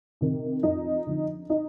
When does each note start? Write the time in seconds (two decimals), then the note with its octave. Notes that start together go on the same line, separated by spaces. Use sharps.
0.21 C3 D#3
0.63 F2 D#4
1.07 D3 F3
1.50 D#4